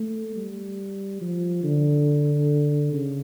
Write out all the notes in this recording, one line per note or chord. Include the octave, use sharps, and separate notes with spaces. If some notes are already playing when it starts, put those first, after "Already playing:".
Already playing: A3
G3
F3
D3
C#3